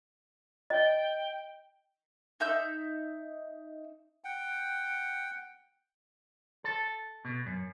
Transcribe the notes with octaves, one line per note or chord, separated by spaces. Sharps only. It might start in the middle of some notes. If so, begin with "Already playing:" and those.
D#5 G5
D#4 E5 E6 G6
F#5 G5
A4
B2
F#2